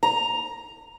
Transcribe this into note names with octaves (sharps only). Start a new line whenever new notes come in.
A#5